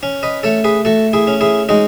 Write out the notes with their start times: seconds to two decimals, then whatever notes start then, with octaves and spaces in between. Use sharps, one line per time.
0.03 C#4
0.23 B4 D#5
0.43 A3 A4 C#5
0.64 G#4 B4
0.85 A3 F#4 A4
1.13 E4 G#4
1.27 C#4
1.41 E4 G#4
1.69 G#3 D#4 F#4